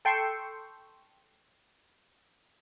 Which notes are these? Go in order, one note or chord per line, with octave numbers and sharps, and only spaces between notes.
A4 G5 C6 C#6 E6